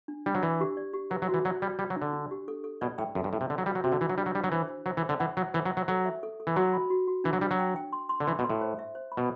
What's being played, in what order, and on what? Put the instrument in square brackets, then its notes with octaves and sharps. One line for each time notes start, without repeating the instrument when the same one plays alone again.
[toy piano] D4
[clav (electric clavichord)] G3 [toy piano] D4
[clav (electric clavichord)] F#3
[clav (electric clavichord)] E3 [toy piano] D5
[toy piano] G4
D5
G4
[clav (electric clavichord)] F#3 [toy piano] B4
[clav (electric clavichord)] F#3
[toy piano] F#4
[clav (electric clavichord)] E3
[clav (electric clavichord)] F#3 [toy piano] D5
[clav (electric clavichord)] G3 [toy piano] D5
[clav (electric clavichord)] G3 [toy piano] D5
[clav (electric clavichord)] F#3
[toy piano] D4
[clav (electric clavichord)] D3
[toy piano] D4
G4
A4
A4
[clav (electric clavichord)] B2 [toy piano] D5
[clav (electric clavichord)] A2 [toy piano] G5
[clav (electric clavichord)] F#2 [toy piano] A4
[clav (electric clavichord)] G2
[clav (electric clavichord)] A2 [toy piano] G5
[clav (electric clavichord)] C3
[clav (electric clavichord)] D3 [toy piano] A4
[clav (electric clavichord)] F#3
[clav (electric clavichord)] G3 [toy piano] F#4
[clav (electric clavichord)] F#3
[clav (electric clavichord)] C3 [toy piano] F#4
[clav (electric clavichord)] D3
[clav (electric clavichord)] E3 [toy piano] D4
[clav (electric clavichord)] F#3
[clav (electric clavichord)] G3 [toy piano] D4
[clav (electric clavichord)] F#3
[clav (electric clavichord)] G3 [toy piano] D4
[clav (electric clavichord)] F#3
[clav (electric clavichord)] E3 [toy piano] C5
[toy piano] C5
[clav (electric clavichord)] F#3 [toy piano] C5
[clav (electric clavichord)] E3
[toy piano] C5
[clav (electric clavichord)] D3
[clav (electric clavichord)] E3 [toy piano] F#5
[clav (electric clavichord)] F#3 [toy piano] F#5
[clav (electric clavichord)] E3 [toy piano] C5
[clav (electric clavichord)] F#3
[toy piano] F#5
[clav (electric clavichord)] F#3
[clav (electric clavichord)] F#3 [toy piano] A4
[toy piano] E5
A4
A4
[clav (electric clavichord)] E3
[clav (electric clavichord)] F#3 [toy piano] F#4
[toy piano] B5
F#4
F#4
[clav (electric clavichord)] E3 [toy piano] D4
[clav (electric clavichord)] F#3
[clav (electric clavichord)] G3 [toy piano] D4
[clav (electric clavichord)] F#3
[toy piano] G5
G5
C6
C6
[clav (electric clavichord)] D3
[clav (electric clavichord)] E3 [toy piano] C6
[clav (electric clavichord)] B2
[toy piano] C6
[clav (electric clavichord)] A2
[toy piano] C5
E5
C5
B5
[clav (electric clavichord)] B2